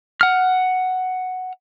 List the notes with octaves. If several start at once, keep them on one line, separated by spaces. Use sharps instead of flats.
F#5 F6